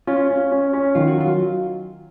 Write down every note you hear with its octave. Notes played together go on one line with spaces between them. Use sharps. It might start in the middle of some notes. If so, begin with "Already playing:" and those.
C#4 F4
C#4
C#4
C#4
D#3 F4
F#4
F#3 F4